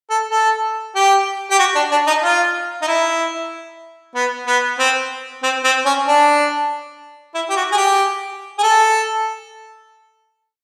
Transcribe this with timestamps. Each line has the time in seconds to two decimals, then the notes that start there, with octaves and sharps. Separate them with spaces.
0.10 A4
0.31 A4
0.95 G4
1.51 G4
1.59 F#4
1.75 D4
1.91 D4
2.07 D#4
2.23 F4
2.82 D#4
2.87 E4
4.15 B3
4.47 B3
4.79 C4
5.43 C4
5.64 C4
5.85 C#4
6.07 D4
7.34 E4
7.50 G4
7.56 F#4
7.72 G#4
7.77 G4
8.58 G#4
8.63 A4